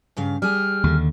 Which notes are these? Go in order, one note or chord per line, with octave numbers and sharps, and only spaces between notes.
G2 C#3 F5
G3 G#4 F6
D#2 D3